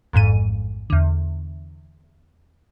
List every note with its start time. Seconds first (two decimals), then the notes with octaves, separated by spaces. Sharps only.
0.13 A1 F2 G#2 D#7
0.90 E2 D3